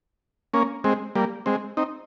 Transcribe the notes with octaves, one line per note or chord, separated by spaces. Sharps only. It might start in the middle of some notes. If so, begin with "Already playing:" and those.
A#3 C#4
G#3 C4
G3 A#3
G#3 C4
C4 D#4